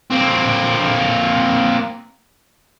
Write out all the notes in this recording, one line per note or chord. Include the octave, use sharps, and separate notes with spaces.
A#3 C4